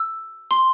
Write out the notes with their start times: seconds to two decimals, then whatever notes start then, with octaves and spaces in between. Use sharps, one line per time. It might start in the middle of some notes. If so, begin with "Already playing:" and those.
Already playing: E6
0.51 C6